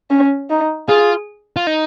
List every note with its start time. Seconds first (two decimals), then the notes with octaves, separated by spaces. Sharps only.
0.10 C#4
0.50 D#4
0.88 F4 G#4
1.56 F4
1.67 D#4